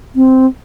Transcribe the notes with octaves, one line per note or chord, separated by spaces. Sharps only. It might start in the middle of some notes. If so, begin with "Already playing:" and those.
C4